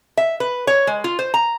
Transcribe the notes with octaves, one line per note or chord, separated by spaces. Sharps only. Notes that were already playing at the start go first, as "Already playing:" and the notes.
E5
B4
C#5
G#3
F4
C5
A#5